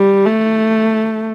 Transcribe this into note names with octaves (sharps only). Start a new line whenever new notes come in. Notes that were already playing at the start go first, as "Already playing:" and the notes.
Already playing: G3
A3